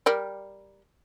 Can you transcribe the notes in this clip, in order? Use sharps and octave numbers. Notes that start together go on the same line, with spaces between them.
G3 A#4 D5